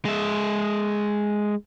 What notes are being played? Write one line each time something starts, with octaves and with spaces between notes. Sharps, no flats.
G#3 E5